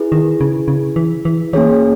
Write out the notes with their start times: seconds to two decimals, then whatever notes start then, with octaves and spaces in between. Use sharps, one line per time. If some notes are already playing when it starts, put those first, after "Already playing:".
Already playing: E4 G#4 B4
0.12 D#3
0.41 C#3
0.68 C#3
0.96 E3
1.25 E3
1.53 E3 A#3 C#4 G#4 C#5